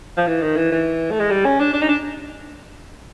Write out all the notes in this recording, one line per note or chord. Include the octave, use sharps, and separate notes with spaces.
F3
E3
D#3
E3
E3
A3
G#3
G3
C#4
D4
D4
D#4
D4